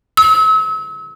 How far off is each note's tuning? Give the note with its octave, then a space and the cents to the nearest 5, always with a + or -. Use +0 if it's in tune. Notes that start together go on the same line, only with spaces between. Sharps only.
E6 -40